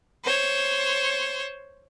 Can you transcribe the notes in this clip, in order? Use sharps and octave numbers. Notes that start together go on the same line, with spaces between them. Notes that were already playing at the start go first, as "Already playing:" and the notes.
C5 C#5